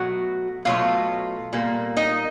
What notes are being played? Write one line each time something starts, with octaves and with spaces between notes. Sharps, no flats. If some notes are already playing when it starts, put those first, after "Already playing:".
Already playing: B2 F#3 A3 F#4 F#5
B2 F#3 A3 F4 F5
A#2 G3 A#3
D#4 D#5